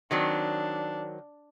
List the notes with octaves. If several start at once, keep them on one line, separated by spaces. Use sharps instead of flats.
D#3 F#3 C4 D4